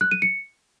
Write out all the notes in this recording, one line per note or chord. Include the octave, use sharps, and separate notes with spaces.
F#6
D#7
C#7